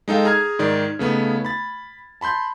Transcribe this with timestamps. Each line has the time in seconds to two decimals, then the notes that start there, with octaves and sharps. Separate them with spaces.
0.08 G#3 D#4 A4 F5 G5
0.25 G#4 A#5 F6 G#6
0.59 G#2 D#3 D5
0.99 C#3 A3 B3 D#4
1.45 B5 A6
2.21 A5 B5 C6 G6